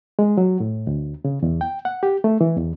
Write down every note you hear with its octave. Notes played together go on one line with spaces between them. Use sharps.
G#3
F#3
A2
D2
C#3
E2
G5
F#5
G4
A3
E3
E2